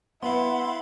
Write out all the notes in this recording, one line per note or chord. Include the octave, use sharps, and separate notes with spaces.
B3 E4 F5 F#5 B5 C6